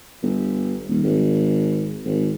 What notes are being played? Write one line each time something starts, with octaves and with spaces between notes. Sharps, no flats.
G1
D#1
G#1
G#1